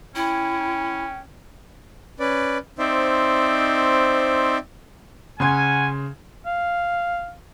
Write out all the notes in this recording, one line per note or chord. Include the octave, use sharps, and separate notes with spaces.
C#4 E4 G5
C#4 B4 D5
C4 D#4 C5 D5 E5
C#3 C#4 F#5 G#5 C6 G#6
F5